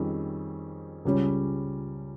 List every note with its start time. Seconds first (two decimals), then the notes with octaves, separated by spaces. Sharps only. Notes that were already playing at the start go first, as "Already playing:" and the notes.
Already playing: F2 D#3 G3 C#4 G#4
1.05 C#2 C#3 G3 C#4